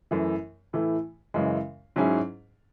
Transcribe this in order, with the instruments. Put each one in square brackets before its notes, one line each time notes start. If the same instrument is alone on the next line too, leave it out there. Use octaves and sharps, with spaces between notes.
[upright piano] F#2 E3 A3 E4
A2 E3 A3
F#2 C#3 E3 G#3
G#2 F#3 C#4 E4 G#4